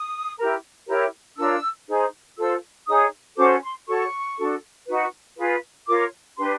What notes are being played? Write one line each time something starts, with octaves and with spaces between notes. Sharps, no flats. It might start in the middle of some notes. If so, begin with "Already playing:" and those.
Already playing: D#6
E4 G4 A#4
E4 G4 A#4 C#5
D4 F4 A#4 C#5 E6
D#4 G#4 C5
F4 A4 C5 E6
D#4 G#4 C#5 D#6
C#4 F#4 A4 C5 D6
C6
F#4 A4 C#5 C#6
D4 F#4 A4
D#4 F#4 B4
F4 G#4 B4
F4 A#4 C#5 D6
D4 G4 B4 C6